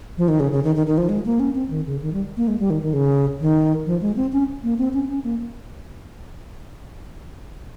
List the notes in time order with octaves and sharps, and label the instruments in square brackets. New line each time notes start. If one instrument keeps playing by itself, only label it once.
[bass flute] F3
D#3
C#3
C#3
D#3
D#3
D#3
F3
G#3
A#3
C#4
C4
D#3
C#3
D#3
G3
A#3
G#3
G3
D#3
D#3
C#3
D#3
F3
G#3
C4
C#4
A#3
C4
C#4
C#4
A#3